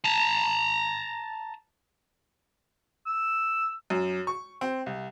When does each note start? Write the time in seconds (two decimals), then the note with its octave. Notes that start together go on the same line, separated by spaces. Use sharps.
0.05 A5 A#5
3.07 E6
3.90 F#2
4.27 C#6
4.61 C4
4.86 C2